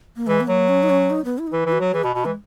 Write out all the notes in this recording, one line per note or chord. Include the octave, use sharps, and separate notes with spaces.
A#3
E3 G#3
B3
F#3 A#3
C#4
D#4
C#4
D#4
B3
E4
D#4
E3 E4
E3 E4
F#4
F#3
E3 G#4
B2 F#4
B2 F#4
E3 G#3